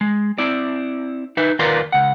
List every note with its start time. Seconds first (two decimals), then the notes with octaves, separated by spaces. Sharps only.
0.01 G#3
0.38 C4 E4 D5
1.37 D#4 B4 E5
1.59 D#2 F4 A#4 B4 D5 C6
1.92 C#2 F#5